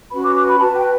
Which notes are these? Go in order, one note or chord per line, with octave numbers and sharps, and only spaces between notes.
C#4 F#4 B4 B5
D6
D6
B5
F#4 B4 A5
G5